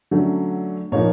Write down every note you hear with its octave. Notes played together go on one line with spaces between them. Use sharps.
D3 F#3 A3 C#4
A#2 F3 A#3 D#4 C#5